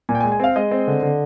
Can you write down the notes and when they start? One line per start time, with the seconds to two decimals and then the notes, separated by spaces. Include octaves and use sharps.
0.09 A#2 G#5
0.15 G5
0.21 G#5
0.24 G#3
0.32 G#5
0.40 C4 F5
0.56 G#3 D#5
0.71 C4
0.88 D3
1.03 D3